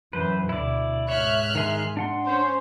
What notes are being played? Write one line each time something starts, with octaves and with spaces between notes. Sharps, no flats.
F#2 E3 B4 C5
D2 B2 E4 D5
G#2 C#5 E5 F6 F#6
D#3 G#4 C6
D4 F#5 C6
C#4 C5